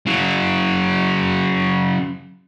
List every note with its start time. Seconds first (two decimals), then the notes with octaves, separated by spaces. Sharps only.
0.06 C#3 F#3